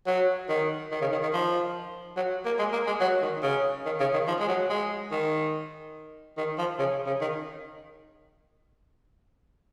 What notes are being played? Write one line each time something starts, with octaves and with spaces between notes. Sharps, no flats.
F#3
D#3
D#3
C#3
D#3
D#3
F3
F#3
A#3
G#3
A#3
G#3
F#3
D#3
C#3
D#3
C#3
D#3
F3
G#3
F#3
G#3
D#3
D#3
F3
C#3
C#3
D#3